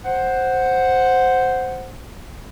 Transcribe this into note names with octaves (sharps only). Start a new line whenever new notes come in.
C5 F#5